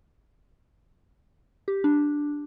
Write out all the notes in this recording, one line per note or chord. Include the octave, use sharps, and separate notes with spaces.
G4
D4